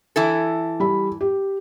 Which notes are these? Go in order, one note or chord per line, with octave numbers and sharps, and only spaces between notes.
E3 E4 A4
G3 B5
G4